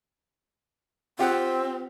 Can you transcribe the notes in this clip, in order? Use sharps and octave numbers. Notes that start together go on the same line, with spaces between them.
C4 F4 G4 F#5